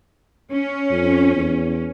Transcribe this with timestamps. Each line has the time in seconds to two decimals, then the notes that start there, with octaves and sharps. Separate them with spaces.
0.53 C#4
0.91 F2
1.36 E2